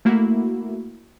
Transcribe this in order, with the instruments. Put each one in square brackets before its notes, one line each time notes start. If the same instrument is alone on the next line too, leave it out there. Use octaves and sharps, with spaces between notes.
[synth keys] A3 A#3 E4 F#4